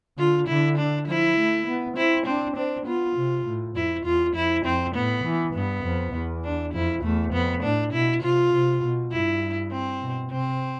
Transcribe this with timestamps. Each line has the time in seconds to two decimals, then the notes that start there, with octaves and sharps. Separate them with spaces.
0.18 D3 F4
0.47 D3 E4
0.77 D4
1.07 F3 E4
1.37 A3
1.67 B3
1.97 C4 E4
2.26 C4 D4
2.56 C4 D4
2.86 B3 F4
3.17 C3
3.46 A2
3.75 F2 E4
4.05 E2 F4
4.35 F2 E4
4.65 F2 C4
4.95 A2 B3
5.24 E3
5.54 G2 B3
5.84 F2
6.13 E2
6.44 D4
6.73 F2 E4
7.03 E2 A3
7.33 F2 B3
7.63 A2 D4
7.93 B2 E4
8.22 C3 F4
8.53 C3
8.83 B2
9.12 G2 E4
9.71 C4
10.01 B2
10.31 C3 C4